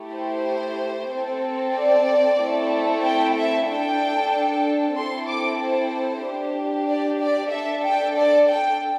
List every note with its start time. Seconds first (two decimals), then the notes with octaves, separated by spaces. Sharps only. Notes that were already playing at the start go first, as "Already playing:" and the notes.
Already playing: A3 E4 G4
0.15 C5
1.10 C4 A4
1.75 D5
2.40 A3 C4 E4 A4
3.04 G5
3.36 E5
3.67 D4 A4 G5
4.96 C4 E4 A4 C6
5.28 D6
5.60 C5
6.24 D4 G4
6.88 D5
7.20 D5
7.52 D4 A4 E5
7.85 G5
8.16 D5
8.49 G5